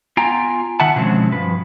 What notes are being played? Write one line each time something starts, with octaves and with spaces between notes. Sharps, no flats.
B3 F4 G5 G#5 A#5
D#3 E5 F#5 A5
B2 D3 F3 G#3 C4 C#4
G2 F3 B4